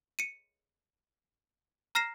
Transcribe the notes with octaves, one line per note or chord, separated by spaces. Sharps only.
C#7 D#7
A#5 F6 A#6 C7 E7